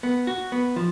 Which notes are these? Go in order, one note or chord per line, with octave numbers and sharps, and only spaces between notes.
B3
F#4
B3
F3